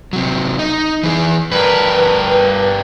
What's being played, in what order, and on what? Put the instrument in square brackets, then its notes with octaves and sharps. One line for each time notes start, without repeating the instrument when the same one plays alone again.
[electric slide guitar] C3 F#3
D#4
E3 G#4
[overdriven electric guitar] G2 A#4 [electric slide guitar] B4